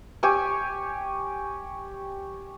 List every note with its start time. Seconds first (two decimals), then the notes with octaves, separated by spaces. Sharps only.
0.23 G4 C#5 G#5 E6